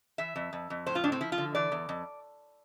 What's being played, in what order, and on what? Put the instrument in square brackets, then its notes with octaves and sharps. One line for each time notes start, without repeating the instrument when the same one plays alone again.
[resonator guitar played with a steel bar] E3 E5
F2
F2
F2
A2 C5
F4
A2 D4
C4
F3 E4
F4
D3
E3 D5
E2
F2